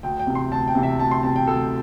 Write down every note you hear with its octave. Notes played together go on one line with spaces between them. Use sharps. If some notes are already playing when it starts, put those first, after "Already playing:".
D2 G5
G5
C3 E3
C6
D2 A5
G5
C3 E3
E5
D2 A5
C6
C3 E3 A5
G5
D2 A4